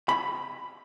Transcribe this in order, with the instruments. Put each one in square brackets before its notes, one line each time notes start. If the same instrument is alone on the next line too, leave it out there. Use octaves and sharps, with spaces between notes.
[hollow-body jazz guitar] B5